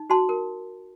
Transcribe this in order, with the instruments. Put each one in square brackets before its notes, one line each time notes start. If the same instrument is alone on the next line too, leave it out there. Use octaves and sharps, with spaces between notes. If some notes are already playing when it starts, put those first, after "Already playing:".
Already playing: [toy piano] D#4
F#4 A5 C6
A#4